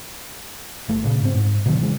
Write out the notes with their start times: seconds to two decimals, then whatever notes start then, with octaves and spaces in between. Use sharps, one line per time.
0.89 G1 A3
1.04 A#2 C#3
1.21 G#2 C4
1.35 G#2
1.66 B2 D3 D#3 F#3
1.81 C#3 E3 G#3